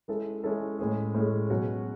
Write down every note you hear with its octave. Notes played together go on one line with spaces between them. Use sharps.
G#3 C#4 E4 A4
G#3 C#4 E4 A4
A2 G#3 C#4 G#4
A2 G#3 C#4 G#4
B2 F#3 C#4 F#4